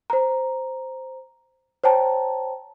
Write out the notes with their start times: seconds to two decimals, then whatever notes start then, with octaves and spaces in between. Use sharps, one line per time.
0.10 C5 A#5
1.84 C5 C#5 G5 A5 A#5